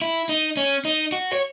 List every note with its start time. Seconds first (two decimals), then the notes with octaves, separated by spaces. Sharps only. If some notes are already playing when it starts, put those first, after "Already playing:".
0.02 E4
0.29 D#4
0.57 C#4
0.85 D#4
1.12 F#4
1.33 C#5